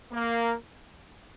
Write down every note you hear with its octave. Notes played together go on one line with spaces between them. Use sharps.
A#3